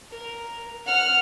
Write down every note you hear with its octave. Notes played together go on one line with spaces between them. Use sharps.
A#4
F#5 F6